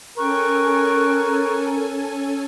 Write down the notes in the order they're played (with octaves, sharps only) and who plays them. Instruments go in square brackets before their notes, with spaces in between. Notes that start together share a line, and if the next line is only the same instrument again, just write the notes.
[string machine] C#4 A4 G#5 [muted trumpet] A#4 [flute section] G5 C#6 F#6